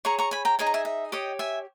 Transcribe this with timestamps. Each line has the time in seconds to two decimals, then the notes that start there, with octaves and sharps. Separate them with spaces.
0.05 G#4 C#5 A#5 C#6
0.19 A#5 C#6
0.31 G#5 B5
0.45 G5 A#5
0.59 D#4 G#4 C#5 G#5
0.67 A#5
0.74 E5 G#5
0.85 E5
1.12 G4 C#5 D#5 G5
1.39 E5 G#5